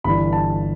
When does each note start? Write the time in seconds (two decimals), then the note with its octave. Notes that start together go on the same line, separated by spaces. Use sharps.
0.04 G1 G2 E3 B5
0.33 A5